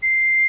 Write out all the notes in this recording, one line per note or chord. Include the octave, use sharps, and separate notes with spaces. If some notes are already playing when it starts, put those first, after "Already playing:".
C7